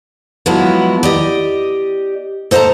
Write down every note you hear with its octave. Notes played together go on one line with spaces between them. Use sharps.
F3 F#3 G#3 B3 E4 F#4
G4 D5 D#5
A4 C5 D#5 F5 A5 A#5